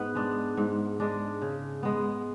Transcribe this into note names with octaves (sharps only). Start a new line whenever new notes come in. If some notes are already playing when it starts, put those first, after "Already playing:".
Already playing: G#2 B3 B4
G#3 D4
G#2
G#3 D4
C#3
G#3 B3